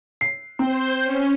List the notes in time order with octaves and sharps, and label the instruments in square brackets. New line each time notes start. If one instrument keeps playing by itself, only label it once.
[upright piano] C7
[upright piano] C4 [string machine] C5 G6
[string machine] C#4